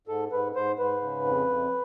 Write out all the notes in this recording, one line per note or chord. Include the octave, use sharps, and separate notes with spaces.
G#2 A4
G#2 B4
G#2 C5
G#2 B4
C#3
F2
F2